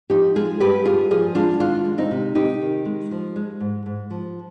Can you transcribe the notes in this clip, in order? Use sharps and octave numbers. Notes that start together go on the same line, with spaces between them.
F3 D#4 G4
G#3 F4 G#4
G2 G4 B4
G2 F4 G#4
F3 F4 G#4
G#3 D4 F4
D#3 D4 F4
G#3
C4 D#4
C3
C3 D#4 G4
D#3
G#3
F3
G#3
G#2
G#2
F3